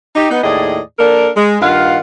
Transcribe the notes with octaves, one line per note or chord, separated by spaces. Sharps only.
D#4 G4
B3 D#4
D#2 A2 G#4 D5 D#5
A#3 D4 A4 A#4
G#3
G2 D#3 F4 F5 F#5